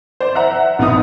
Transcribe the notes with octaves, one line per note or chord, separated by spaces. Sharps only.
C5 D5
E5 F#5 A#5
A#1 B3 D#4 D#6